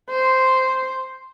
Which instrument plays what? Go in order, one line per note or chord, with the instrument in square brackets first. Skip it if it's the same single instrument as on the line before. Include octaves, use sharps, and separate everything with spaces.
[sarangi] C5